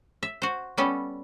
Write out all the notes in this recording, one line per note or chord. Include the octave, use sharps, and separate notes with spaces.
E5
F#4 C5
G3 B3 C#4 A4